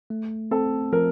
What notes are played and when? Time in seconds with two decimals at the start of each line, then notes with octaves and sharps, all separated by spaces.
0.10 A3
0.51 C4 A4
0.92 F3 A#4